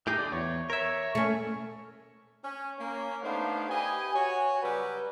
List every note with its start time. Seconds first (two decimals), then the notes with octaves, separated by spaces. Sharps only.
0.07 A2 D#4 G4 G#4
0.18 D3 D5
0.32 E2 C#5
0.70 A#4 C#5 E5
1.15 A3 C#4 C#6
2.44 C#4
2.78 A#3 C#4
3.22 A3 B3 D4 D#4 C5 F5
3.69 G4 B4 D#5 G#5
4.14 F#4 C#5 G#5
4.62 C#3 F#3 G3 B4